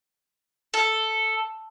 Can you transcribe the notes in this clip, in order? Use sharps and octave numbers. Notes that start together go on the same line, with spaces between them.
A4